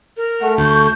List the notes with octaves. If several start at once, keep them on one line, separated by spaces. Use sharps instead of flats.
A#4
A3 F#5
D2 C#6 G6